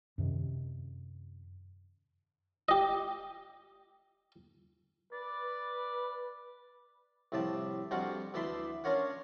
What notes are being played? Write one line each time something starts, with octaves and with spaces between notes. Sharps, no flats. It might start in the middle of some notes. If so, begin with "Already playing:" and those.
F#2 C3 D#3
G4 D#5
B4 D5
C2 A2 F3 D5 A5
F2 G3 D4 F4 F#4 F#5
D2 E3 D5 A5 B5 C6
C#4 D4 F4 A#4 C#5 F#5